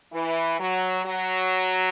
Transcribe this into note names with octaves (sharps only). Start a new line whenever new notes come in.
E3
F#3
F#3